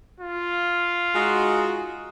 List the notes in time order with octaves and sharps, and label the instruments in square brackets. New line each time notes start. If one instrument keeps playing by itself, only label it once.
[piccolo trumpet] F4
[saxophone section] G#3 D#4 F#4